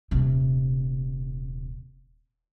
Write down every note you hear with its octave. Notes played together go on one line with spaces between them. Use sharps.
D#1 C3